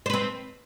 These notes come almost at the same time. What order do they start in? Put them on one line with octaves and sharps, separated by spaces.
C5 B4 C4